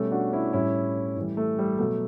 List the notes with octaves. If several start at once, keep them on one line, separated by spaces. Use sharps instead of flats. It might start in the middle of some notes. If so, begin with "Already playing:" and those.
Already playing: B2 G3 A3 C#4
D4 F#4
C#4 E4
A2 G3 C#4 E4
A2 E3 G3
A3
G3
B2 F#3 A3